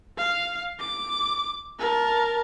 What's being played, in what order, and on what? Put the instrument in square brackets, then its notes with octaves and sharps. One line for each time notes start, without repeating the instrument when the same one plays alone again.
[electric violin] F5
D6
A#4 A5